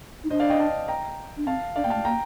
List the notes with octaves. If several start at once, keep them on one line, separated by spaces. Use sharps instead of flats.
D#4
D4 C5 D#5
D5 F5
D#5 G5
F5 A5
G5 A#5
D4
C4 F5 A5
D4 D5 F5
A#3 G5
A3 F5 A5
A#3 G5 A#5